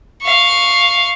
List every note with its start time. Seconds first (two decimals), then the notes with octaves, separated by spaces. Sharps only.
0.22 F5 C#6